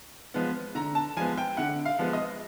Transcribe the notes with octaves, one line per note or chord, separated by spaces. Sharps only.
F3 G#3 B3
D3 A#5
A5
F3 G#3 B3 G#5
G5
D3 F#5
F5
F3 G#3 B3
D#5